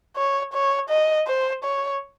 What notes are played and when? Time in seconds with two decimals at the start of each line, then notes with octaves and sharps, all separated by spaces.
0.16 C#5
0.53 C#5
0.89 D#5
1.27 C5
1.64 C#5